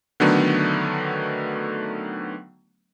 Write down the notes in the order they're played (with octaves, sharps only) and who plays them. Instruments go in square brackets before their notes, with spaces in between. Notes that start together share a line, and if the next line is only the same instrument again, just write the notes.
[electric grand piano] D3 D#3 F#3 A3 B3 D4